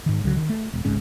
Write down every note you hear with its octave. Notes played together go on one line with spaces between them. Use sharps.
G#2 D#3
C#2 D3 E3 F#3
D#3
A3
E1
G#1 C#2 G#2 C#4